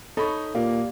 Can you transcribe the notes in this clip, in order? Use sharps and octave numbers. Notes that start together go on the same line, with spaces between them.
D#4 A4 C#5 B5 C#6
A#2 A#3 G4 D5 F5